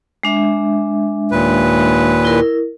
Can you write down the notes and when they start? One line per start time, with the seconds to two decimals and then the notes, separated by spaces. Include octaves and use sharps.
0.23 G#3 D4 E5
1.31 D#2 A#2 B4
2.25 E4 A#4